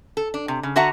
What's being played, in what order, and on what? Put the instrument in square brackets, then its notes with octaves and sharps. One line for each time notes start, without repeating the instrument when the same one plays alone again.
[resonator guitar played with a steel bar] A4
D4
C3
C#3
D3 F#4 E5 F#5 A5 A#5